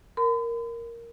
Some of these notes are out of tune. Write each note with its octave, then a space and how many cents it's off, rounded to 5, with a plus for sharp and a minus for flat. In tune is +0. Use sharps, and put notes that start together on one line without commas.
A#4 +0 B5 +45